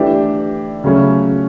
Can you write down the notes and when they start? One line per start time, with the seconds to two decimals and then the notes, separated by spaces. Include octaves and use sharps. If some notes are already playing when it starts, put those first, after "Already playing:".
Already playing: E3 A3 D4 G4
0.84 C#3 F#3 A3 C#4